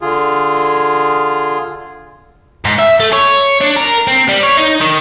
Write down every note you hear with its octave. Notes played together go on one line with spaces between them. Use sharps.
D3 F4 G#4
G#2
E5
A3
C#5
D4
A#4
C4
G3
C#5
D#4
D#3